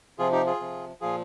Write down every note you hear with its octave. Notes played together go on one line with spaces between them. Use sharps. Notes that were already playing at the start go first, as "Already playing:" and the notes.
C3 F3 F4 G#4
D#4 G4
F4 G#4
C3 F3
A#2 F3 F4 G#4